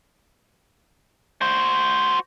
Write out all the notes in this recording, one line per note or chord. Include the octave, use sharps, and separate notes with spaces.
F#4 C5